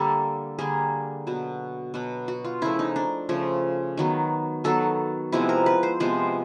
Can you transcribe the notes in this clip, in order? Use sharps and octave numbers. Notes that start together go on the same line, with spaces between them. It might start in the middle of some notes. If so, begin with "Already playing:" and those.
Already playing: D3 G3 A#3 A4
D3 G3 A#3 G#4
B2 F#3 B3
B2 F#3 B3
F#4
F4
C#3 F3 A3 E4
D#4
D4
C#3 F3 A3
D#3 F#3 B3
D#3 F#3 B3 A4
C3 F3 G#3 B3 E4
A#4
B4
C5
C3 F3 G#3 B3 C5